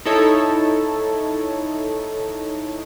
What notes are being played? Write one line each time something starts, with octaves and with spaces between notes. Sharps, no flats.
D#4 E4 A4 C#5